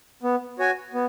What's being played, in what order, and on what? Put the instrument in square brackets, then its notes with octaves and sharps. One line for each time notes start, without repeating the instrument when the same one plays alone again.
[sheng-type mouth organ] B3
F#4 C#5 G#5
B3